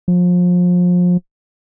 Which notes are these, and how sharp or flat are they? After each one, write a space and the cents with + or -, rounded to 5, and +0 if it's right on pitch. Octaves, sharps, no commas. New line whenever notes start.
F3 +30